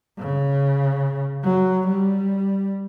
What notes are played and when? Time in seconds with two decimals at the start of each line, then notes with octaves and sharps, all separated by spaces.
0.19 C#3
1.44 F#3
1.87 G3